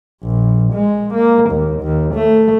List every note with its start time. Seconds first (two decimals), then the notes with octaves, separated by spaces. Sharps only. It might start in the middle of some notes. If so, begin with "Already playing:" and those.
0.23 A#1
0.74 G#3
1.14 A#3
1.50 D#2
1.82 D#2
2.15 A3